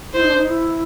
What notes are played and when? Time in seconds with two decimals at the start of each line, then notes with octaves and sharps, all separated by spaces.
0.13 E4 C5
0.22 D#4
0.28 D4
0.37 D#4
0.47 E4